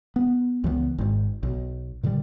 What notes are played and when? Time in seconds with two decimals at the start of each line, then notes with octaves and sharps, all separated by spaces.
0.16 B3
0.64 C#2 E3 G3 B3
0.98 G#1 G#2
1.43 B1
2.03 A#2 D3 E3 G3